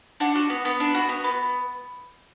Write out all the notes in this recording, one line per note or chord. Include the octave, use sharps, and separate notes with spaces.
D4 F#5
F#4
B3
B3
D4
F#4
B3
B3